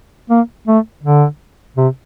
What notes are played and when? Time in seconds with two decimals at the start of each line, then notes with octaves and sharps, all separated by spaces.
0.30 A#3
0.67 A3
1.04 D3
1.77 C3